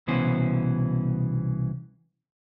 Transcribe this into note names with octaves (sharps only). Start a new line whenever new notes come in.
C2 B2 E3 B3 C#4 C5